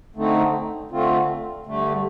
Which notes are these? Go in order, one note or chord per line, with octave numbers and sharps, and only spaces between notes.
D3 A3 C4 D#4
D3 A3 C4 F4
G2 D3 A3